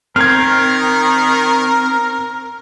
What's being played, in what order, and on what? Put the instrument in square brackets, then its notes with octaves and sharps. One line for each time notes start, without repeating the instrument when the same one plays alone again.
[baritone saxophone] D#3 [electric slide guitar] C4 [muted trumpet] A#4 [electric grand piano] F6 G#6